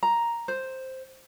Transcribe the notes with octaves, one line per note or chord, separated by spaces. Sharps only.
A#5
C5